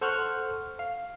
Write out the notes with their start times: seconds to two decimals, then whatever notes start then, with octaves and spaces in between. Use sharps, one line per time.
0.01 A4 C5 F#5 C#6 F6 F#6
0.79 F5